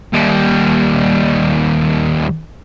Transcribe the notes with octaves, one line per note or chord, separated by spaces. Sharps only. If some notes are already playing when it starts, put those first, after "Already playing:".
D#2 G3